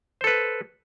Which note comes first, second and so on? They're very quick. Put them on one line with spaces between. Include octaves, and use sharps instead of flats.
C5 A4 B4